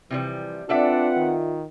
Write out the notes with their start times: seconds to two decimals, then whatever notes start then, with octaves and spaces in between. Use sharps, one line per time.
0.10 C3 E3 F3 G3
0.69 C4 D4 F4 A4 B4 D5 E5 F#5
1.17 D#3